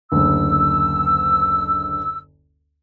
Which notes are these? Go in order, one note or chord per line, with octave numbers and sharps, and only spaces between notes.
F#1 D2 E6